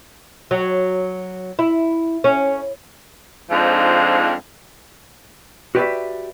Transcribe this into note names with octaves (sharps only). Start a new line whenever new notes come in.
F#3
E4
C#4
F2 G#2 F3 C4 D4 D#4
F#4 G4 B4 C#5 D5 E5